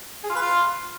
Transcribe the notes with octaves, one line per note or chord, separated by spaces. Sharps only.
G#4
F4
B4
F4